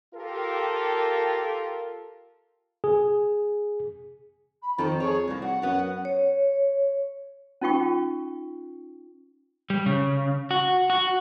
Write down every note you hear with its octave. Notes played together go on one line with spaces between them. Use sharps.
F4 G4 A4 A#4
G#4
B5
F2 D#3 A4 A#5
G#4 C#5
C2 B2 A#3 D5
F#4 F#5
F#2 B3 F#4 F#5
C#5
C#4 D#4 F4 G5 C#6
G3
C#3
F#4
F#4